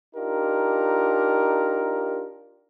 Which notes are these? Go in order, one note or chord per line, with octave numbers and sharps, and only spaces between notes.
D4 D#4 F4 G4 A#4